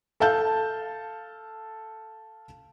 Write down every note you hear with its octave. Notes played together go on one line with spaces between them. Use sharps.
A4 F5 A5 G6